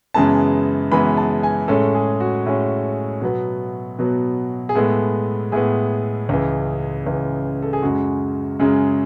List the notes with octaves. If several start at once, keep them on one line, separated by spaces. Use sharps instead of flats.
F#2 C#3 E3 G#3 B3 A5
F#2 C#3 E3 G#3 B3 B5
A5
G#5
A2 G#3 C#4 A4
G#4
F#4
A2 G#3 C#4
B2 F#3 B3
B2 F#3 B3
G#4
A2 G#3 B3 A4
A2 G#3 B3 G#4
C#2 C#3 E3
C#2 C#3 E3
A4
G#4
F#2 C#3 G#3 F#4
F#2 C#3 G#3